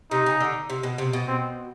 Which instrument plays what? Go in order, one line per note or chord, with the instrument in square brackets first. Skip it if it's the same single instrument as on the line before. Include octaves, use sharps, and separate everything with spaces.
[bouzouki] C3 [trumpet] D#4
[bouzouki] C#3
D3
C3
B2
C3
B2
[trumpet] C4